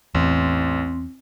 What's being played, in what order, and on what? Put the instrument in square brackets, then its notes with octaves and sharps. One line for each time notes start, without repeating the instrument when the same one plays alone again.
[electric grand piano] A1 [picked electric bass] E2 [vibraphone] C4